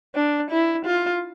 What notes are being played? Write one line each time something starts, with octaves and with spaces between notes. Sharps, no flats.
D4
E4
F4